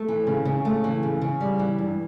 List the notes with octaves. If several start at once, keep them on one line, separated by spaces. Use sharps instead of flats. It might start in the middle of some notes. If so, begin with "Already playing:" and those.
Already playing: A3
E3
C#3
C#3
A3
E3
C#3
C#3
G3
E3
G2